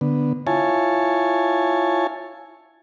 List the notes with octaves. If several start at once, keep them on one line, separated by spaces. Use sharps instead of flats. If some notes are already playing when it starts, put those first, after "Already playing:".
D3 B3
E4 F4 C#5 G#5 A5